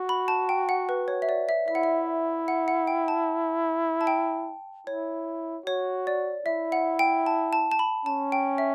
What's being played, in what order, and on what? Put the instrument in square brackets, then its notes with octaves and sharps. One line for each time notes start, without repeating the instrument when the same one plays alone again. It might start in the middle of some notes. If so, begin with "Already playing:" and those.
Already playing: [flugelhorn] F#4
[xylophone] B5
A5
G5
F#5
B4
C#5
E5
D5
E5
[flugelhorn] E4 [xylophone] E5
[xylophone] F#5
E5
F#5
F#5
G5
A5
A5
G5
[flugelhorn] E4 [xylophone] C#5
[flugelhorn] F#4 [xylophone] C#5
[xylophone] D5
[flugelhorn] E4 [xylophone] E5
[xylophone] F#5
G5
A5
A5
A5
B5
[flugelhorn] C#4 [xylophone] A5
[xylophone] G5
E5